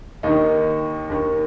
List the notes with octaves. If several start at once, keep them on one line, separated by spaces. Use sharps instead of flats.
D#2 D#3 D#4
D#2 D#3